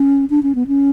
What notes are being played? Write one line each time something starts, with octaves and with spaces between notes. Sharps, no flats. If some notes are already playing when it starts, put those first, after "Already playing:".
Already playing: C#4
D4
C#4
B3
C#4